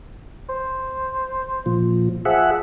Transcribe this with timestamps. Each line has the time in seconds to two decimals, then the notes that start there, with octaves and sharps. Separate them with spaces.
0.49 C5
1.66 A#2 F3
2.25 F3 G#4 E5 F#5